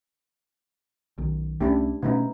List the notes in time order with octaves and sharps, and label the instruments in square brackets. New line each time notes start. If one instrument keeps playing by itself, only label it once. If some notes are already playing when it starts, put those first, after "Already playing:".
[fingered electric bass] B1 D#3
[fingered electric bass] C2 A3 C#4 [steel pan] D4 E4 G4
[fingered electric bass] B2 A3 C#4 [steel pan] B3 D#4 E4